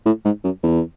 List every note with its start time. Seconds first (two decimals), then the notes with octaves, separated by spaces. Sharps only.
0.05 A2
0.25 G#2
0.44 F#2
0.63 E2